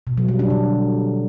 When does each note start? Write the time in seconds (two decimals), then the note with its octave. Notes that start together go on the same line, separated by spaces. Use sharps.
0.07 B2
0.18 F#3
0.28 G3
0.39 D4
0.50 D3